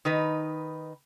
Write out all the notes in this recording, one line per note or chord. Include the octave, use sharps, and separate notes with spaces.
D#3 D#4 B4